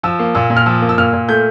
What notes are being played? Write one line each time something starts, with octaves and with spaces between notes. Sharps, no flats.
F3 E6
A#3
A#2 E6
A#2
F6
F3 E6
A#3
E6
A#2 F6
A#2
A3 G6